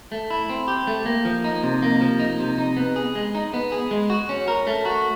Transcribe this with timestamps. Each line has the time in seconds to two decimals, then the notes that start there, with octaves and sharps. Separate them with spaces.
0.12 A3
0.30 E4
0.49 C4
0.68 G4
0.87 A3
1.06 A#3
1.25 F3
1.44 D#4
1.63 C3
1.82 A#3
2.01 F3
2.20 D#4
2.40 C3
2.58 D#4
2.77 B3
2.96 G#4
3.15 G#3
3.35 D#4
3.54 B3
3.72 G#4
3.91 G#3
4.10 F#4
4.29 C#4
4.48 A#4
4.67 A3
4.85 F#4